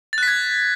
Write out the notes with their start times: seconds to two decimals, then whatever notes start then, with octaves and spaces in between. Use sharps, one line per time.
0.13 A6
0.18 F#6
0.23 B6
0.28 G#6